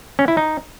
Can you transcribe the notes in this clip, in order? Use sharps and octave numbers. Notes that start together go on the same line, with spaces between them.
C#4
E4
D#4